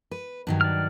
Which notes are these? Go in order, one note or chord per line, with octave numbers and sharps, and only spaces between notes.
B4
G2 D#3 F#3
D5 F6